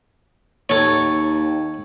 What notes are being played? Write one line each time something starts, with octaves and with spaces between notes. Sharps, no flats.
D#2 A4 C#5